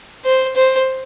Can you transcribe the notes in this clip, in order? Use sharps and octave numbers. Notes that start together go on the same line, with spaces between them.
C5
C5